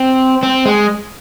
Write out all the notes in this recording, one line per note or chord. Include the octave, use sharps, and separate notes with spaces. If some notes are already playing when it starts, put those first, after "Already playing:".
Already playing: C4
C4
G#3